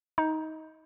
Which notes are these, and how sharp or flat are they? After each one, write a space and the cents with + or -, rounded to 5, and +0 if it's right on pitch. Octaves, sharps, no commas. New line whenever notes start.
D#4 +20